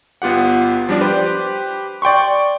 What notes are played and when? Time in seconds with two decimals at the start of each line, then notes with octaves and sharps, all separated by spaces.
0.22 G1 B3 F4 G4 F#5
0.89 F3 G3 D4 D5
1.01 G4 B4 C5
2.02 D5 G5 C6 C#6